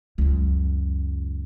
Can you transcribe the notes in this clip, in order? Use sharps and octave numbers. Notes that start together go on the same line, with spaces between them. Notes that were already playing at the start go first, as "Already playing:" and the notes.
C#2 F#2